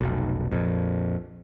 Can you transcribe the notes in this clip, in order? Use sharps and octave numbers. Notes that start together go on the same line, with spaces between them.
F1 B1
A#1 F2